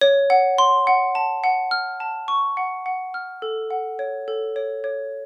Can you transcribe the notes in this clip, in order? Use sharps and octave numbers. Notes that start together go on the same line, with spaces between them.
C#5
F#5
C6
F#5
A5
F#5
F6
A5
C#6
F#5
F#5
F6
A4
F#5
C#5
A4
C#5
C#5